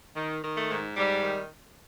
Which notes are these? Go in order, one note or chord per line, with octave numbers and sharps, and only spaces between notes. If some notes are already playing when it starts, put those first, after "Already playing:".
D#3
D#3
A3
G#2
G#2 G3
D#3